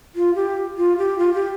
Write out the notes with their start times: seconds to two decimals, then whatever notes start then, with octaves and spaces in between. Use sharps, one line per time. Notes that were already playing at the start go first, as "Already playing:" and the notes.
0.15 F4
0.35 G4
0.78 F4
0.98 G4
1.19 F4
1.34 G4